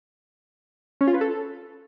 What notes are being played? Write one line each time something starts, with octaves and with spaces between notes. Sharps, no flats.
C#4
F4
B4
A4